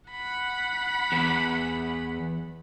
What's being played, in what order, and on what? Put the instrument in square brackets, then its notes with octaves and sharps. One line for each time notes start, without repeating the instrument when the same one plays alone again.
[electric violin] F#5 B5
[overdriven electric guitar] E2